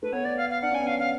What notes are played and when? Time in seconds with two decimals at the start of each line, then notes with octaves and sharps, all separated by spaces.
0.02 A3 B4
0.13 B3 C#5
0.25 D5
0.37 F5
0.50 F5
0.62 D4 F#5
0.71 C#4 G#5
0.81 B3
0.87 C#4 F5
0.99 F5